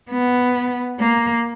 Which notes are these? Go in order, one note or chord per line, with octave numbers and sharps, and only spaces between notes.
B3
A#3